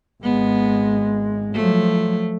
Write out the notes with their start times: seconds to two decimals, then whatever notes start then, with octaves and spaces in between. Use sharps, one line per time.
0.23 G#1 G#3 B3
1.54 F3 F#3 A3